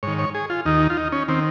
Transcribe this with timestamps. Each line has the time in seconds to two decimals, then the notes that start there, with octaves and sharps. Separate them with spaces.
0.03 G#2 D#3 C#5
0.19 C#5
0.35 G#4
0.50 F4
0.65 D#2 D#3 D#4
0.90 F4
0.97 D#4
1.12 C#4
1.28 D#3 C4